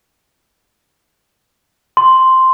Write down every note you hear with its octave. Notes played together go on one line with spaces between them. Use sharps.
C6